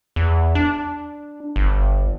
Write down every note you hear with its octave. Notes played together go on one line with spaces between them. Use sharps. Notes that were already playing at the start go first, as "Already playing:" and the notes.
E2
D4
G1